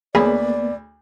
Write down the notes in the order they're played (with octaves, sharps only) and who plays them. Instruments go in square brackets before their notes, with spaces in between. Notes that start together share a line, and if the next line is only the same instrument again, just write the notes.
[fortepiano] D2 B5 [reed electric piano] A#3 B3 [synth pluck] G#4 C#5 [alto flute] D5